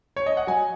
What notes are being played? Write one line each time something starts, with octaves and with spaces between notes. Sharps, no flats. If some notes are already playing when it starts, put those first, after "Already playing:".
C#5
D#5
F#5
F#3 D#5 G#5